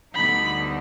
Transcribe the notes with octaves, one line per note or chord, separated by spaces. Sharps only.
D2 D3 G3 B3 D#4 B5